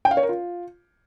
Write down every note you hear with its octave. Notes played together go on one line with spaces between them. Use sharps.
G5
F5
C#5
A#4
F4